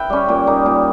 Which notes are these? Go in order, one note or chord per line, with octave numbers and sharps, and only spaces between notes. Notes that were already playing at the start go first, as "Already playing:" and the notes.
Already playing: B4 E5 G5
G3 C#4
A#2
A#3 D#4
A#2